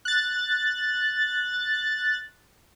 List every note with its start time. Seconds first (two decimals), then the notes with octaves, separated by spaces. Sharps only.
0.05 F#6 A6